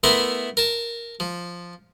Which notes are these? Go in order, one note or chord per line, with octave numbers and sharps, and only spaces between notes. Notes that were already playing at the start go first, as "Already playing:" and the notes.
A3 B3 E4 A#4 C6
A#4 A5
F3